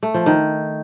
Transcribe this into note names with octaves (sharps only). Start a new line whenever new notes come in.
A3
F3
D#3